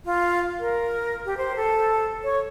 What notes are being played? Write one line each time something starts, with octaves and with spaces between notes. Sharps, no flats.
F4
A#4
G4
C5
A4
C#5